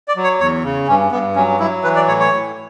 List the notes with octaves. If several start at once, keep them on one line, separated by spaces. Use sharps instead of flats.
D5
F#3
C#5
E2 C#5
C#3
G2 C#4
G2 B3
F#3 C#4
F#3 E4
E3 B4
D5
A2 C#5
C#5
A2